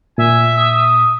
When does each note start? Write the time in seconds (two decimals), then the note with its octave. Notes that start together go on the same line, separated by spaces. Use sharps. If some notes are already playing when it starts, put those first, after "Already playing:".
0.18 A#2 E5 G#5
0.56 D#6